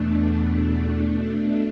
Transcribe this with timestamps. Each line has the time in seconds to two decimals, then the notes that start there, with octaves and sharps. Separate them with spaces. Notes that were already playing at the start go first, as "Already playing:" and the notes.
Already playing: E2 B2 A3 D4
1.01 B2 A3 D4